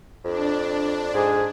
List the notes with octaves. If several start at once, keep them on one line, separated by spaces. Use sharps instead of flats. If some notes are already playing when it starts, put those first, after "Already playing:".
F2 D4
G#2 G#4